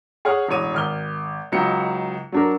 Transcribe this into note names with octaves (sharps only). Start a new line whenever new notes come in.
G#4 C#5 F#5 F6
E1 A1 C#5 D#7
G#1 F6 G7
C#2 F#3 D#4 C#7
F#3 D4 A#4